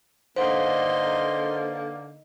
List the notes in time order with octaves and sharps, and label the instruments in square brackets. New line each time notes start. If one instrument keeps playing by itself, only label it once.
[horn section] D3 A#3 [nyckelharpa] D#4 C6 [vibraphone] B4 F5 [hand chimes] C5 F#5